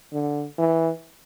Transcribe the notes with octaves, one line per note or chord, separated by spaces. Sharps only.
D3
E3